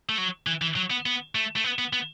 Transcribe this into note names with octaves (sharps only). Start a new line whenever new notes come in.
A3
F#3
E3
E3
F#3
B3
B3
A3
A3
B3
B3
B3